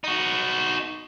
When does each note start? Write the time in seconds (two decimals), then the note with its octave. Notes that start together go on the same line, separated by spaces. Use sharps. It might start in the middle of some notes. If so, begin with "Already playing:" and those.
0.04 D#4 F#4